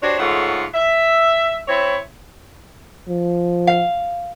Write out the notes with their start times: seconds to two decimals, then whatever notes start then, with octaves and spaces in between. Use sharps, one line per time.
0.02 D4 F#4 G4 C5 C#5
0.19 G#2 C#3 A3 F4 C#5 F#5
0.74 E5
1.68 C4 E4 C#5
3.08 F3
3.67 F5